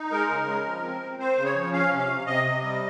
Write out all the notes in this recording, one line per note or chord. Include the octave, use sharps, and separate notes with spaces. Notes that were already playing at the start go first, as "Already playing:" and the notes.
Already playing: D#4
G#3 A#4
C#3
G#3
F3
C4
C4
C4 C5
C#3
C#5
F3
C#4 F5
C3
F5
C3
C3 D#5
C3
G3